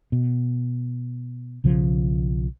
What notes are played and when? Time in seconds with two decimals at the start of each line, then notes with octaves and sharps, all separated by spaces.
0.12 B2
1.64 B1 C#3 F3